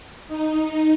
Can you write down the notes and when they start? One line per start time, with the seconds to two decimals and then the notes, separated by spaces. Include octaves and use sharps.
0.28 D#4